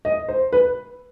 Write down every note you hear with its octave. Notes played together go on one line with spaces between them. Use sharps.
D#5
C5
B4